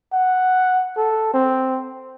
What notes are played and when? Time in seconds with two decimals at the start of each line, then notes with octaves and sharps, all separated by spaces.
0.13 F#5
0.97 A4
1.34 C4